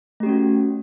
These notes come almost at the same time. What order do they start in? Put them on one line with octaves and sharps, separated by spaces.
A3 G4 C#4 F#4